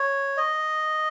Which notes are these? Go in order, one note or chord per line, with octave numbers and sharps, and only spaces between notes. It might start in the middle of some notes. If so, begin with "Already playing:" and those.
Already playing: C#5
D#5